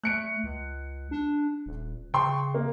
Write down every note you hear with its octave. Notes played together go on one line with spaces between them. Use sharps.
A3 F#6 C#7 D7
C#2
D4
D#1
C#3 G5 C6 C#6
A#3